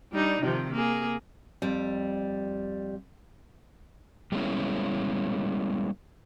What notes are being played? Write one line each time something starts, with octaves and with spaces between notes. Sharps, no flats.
G3 D4 D#4
C3 D#3 F3
A#3 G#4
F2 G3
G3 G#3 A#3 B3 C#4 E4